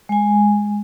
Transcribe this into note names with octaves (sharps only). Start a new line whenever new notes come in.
G#3 G#5